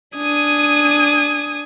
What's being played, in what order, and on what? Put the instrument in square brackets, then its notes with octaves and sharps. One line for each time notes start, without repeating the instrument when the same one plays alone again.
[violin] D4 [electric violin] G#5 D#6